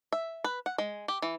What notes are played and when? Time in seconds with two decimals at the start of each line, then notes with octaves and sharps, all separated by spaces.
0.13 E5
0.44 B4
0.66 F#5
0.78 G#3
1.08 G4
1.22 E3